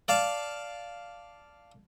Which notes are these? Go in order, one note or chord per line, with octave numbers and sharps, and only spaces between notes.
D5 F5 A5